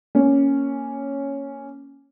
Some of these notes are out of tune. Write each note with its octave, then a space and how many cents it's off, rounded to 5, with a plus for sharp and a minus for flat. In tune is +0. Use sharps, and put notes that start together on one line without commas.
A#3 +0 C#4 +0